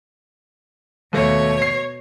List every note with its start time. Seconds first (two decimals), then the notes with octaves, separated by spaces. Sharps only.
1.13 D#2 B2 A3 C#5
1.62 C7